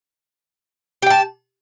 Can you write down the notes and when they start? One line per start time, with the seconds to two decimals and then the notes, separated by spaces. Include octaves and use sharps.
1.02 G4
1.06 G5
1.10 A5